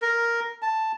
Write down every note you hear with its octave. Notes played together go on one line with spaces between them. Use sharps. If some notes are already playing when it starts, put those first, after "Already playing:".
A#4
A5